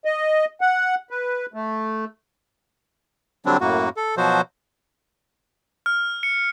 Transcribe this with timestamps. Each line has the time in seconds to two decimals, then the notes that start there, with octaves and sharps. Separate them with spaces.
0.05 D#5
0.61 F#5
1.10 B4
1.54 A3
3.46 D3 F#3 G3 C4 D4
3.61 F#2 A2 A#3 F#4
3.97 A4
4.17 B2 F3 F#3 F#4 C5
5.86 F6
6.23 C#7